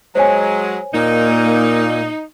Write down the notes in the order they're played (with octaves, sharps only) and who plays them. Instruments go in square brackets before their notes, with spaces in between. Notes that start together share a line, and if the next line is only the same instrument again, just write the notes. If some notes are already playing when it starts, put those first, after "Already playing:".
[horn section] F#3 G#3 [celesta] C5 C#5 G#5
[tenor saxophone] A#2 [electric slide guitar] A#3 [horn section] D#4